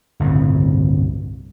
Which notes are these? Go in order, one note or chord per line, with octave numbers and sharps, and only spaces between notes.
G1 C2 A2 C#3